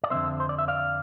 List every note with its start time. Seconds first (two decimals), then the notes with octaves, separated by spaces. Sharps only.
0.04 D5
0.10 F2 D3 G#3 C4 C5 E5
0.40 C5
0.49 D5
0.58 E5
0.68 D5 F5